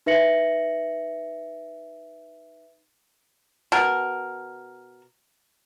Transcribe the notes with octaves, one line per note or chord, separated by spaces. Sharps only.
D#4 B4 E5 A#6 C#7 F#7
B2 A#4